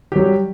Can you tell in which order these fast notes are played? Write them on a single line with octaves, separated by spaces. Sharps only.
G4 F#3 G3